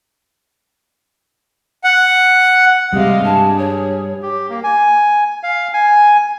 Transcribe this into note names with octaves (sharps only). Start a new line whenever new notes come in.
F#5
C3 G3 G#3 D#5 F5
G2 G#4 A5
C#5
G4
A#3
G#5
F5
G#5